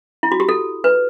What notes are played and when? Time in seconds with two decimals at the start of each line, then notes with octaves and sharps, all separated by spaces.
0.23 E4
0.32 F#4
0.40 G4
0.49 A4
0.84 B4